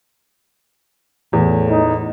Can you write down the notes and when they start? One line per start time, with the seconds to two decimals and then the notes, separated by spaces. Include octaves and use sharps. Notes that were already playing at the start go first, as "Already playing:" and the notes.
1.33 E2 A2
1.71 D#4